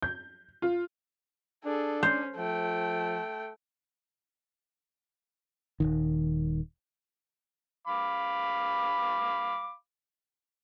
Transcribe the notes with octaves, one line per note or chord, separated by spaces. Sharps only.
G6
F4
D4 G#4 A4
C#4 C5
F3 A3 G5
D#1 B1 D#3
F5 B5 D6